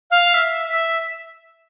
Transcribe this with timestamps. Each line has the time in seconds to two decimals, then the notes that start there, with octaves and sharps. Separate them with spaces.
0.11 F5
0.34 E5
0.69 E5